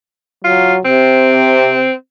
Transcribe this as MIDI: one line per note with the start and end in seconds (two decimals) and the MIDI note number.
0.44 0.80 54
0.44 0.74 65
0.85 1.85 48
0.85 1.93 60